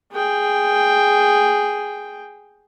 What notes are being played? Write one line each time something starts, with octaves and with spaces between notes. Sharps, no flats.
G#4 G5